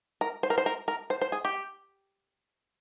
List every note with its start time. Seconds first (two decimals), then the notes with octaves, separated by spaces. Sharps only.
0.21 A#4
0.43 C5
0.50 A#4
0.58 C5
0.66 A#4
0.88 A#4
1.10 C5
1.21 C5
1.32 G#4
1.45 G4